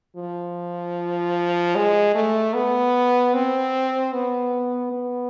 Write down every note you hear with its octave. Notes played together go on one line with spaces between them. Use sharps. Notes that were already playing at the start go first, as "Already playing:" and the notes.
F3
G#3
A3
B3
C4
B3
B3